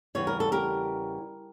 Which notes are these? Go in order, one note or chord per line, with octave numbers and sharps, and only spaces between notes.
E2 C#3 E3 G3 C#5
A#4
A4
G4 A#4